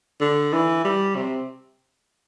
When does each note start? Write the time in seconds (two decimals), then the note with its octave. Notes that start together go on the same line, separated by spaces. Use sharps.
0.21 D3
0.53 E3
0.84 G3
1.16 C3